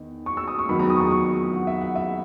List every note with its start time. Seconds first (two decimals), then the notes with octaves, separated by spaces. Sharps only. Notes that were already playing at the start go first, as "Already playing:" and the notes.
Already playing: E2 D#3
0.26 C#6
0.37 E6
0.48 D#6
0.59 C#6
0.69 E2 D#3 F#3 B5
0.79 A#5
0.90 D#6
0.96 C#6
1.00 D#6
1.11 C#6
1.53 F#5
1.67 E5
1.81 F#5
1.96 E5